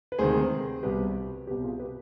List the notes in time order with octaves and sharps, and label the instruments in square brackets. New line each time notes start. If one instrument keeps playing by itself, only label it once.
[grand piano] B4
D2 C3 D#3 G#3 G#4 C5
C2 B2 G3 G4 B4
C2 B2 G3 G4 B4
F4 G#4
G4 B4